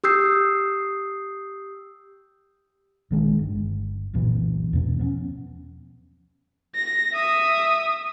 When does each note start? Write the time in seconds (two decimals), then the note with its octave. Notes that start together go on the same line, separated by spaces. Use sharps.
0.04 G4 D#6 E6 G6 C7
3.11 A#1 D#3 G#3 D4
3.39 G1
4.14 F#1 C2 A#2 E3
4.73 E2 B2
4.99 F3 B3 C#4
6.75 A#6
7.13 E5 D#6